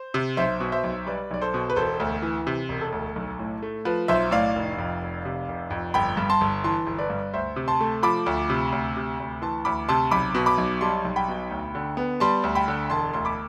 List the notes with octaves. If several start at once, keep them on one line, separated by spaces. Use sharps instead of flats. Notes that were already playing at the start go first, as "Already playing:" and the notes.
Already playing: C5
C3
B1 C5 E5
B2
C5 E5
B1
G3 B4 D5
B1 D5
A4 C5
B2
B4
E1 A4 C5
D2
E3
C3
E1
A4
D2
B1
A2
A3
F3 B4
B1 C5 E5
A2 D5 F5
F1
F2
F1
C3
F1
F2
G1 G5 B5
G2
A5 C6
G1
E3 A5 C6
G1
B4 D5
G2
D2 C5 E5
C3
A5 C6
A3
F3 B5 D6
D2
C3
D2
C3
D2
E3 A5 C6
D2 B5 D6
C3 A5 C6
B1 B5 D6
B2
B5 D6
B1
G3 A5 C6
B1
G5 B5
B2
D2
D3
B3
G3 A5 C6
D2
G5 B5
D3
E1 A5 C6
D2 C6
B5 D6